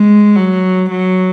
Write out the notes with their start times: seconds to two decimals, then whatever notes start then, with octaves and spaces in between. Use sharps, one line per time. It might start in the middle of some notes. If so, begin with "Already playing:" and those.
Already playing: G#3
0.36 F#3
0.91 F#3